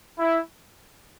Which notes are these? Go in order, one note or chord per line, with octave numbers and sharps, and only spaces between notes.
E4